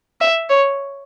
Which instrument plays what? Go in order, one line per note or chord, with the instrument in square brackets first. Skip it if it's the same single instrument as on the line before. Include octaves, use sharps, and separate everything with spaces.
[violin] E5
C#5